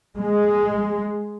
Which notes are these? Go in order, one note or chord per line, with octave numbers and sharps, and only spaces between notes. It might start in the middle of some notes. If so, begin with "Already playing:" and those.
G#3